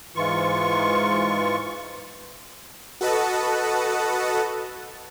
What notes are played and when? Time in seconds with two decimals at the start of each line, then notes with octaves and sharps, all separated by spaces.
0.16 G#2 E3 F4 C#6
3.01 F#4 A4 B4 D#5 F#5 A5